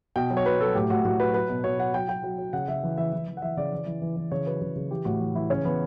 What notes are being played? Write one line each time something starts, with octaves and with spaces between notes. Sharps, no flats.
B2 G5
F#3
C#5
B2 B4
F#3 A4
A2 G4
A2 F#4
A2 F#4
F#3 B4
F#3 B4
B2
B2 C#5
F#3 F#5
F#3 G5
F#3 G5
F#3
F#3
C#3 F#5
C#3 E5
E3
E3 E5
E3
E3
F#5
E3 E5
C#3 D5
E3
E3
E3
E3
C#3 C#5
F#3 B4
C#3
C#3
E3 G4
A2 F#4
E3
E3 E4
C#3 C#4
E3 B3